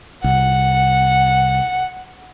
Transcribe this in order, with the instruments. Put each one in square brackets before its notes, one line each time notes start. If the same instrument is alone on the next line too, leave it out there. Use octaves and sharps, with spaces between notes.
[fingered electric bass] C2 [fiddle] F#5